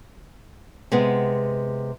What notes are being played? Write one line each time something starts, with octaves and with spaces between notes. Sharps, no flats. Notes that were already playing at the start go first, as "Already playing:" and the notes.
C3 G#3 B3